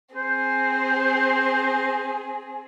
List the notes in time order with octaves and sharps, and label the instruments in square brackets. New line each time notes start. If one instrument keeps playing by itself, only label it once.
[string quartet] C4 G#4 [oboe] C5